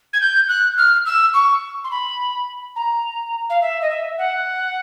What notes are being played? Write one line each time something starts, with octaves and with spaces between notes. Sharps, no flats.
G#6
G6
F#6
F6
E6
C#6
C6
B5
A#5
F5
E5
D#5
E5
F#5